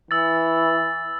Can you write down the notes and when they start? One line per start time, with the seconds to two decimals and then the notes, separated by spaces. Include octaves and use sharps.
0.11 E3 E6 A6